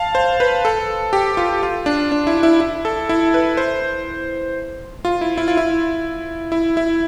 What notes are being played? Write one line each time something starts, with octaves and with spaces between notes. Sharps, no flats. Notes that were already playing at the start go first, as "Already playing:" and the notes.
Already playing: F5 A5
C5
B4
A4
G4
F4
F4
D4
D4
E4
E4
E4
A4
E4
B4
C5
F4
E4
E4
F4
E4
E4
E4